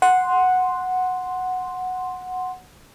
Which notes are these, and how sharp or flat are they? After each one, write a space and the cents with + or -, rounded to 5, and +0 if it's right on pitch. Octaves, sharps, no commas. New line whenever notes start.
F#5 -5 C6 +0